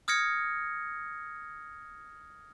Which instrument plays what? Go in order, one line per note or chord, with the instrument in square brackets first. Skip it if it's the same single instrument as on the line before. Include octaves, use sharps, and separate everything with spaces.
[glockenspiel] D#6 F6 G#6 A#6 C#7